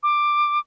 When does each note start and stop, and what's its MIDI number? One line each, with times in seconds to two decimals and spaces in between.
0.03 0.59 86